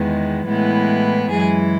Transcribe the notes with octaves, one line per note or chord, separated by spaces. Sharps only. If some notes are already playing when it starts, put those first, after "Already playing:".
Already playing: E2 D#3 G#3 B3
A2 E3 G#3 B3
F#2 E3 G#3 G#4